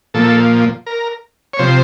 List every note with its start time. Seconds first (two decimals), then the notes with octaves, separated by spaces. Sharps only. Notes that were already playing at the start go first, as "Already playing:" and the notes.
0.14 A#2 F3 A4
0.86 A#4
1.53 C#5
1.59 C3 F3 C5